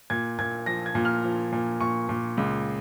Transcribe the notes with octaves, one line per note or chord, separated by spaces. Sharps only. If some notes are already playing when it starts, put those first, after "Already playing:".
A#2 G#6
A#2 G#6
F3 A#6
G#6
A#2
F6
F3
A#2
A#2 C#6
A#2
C#2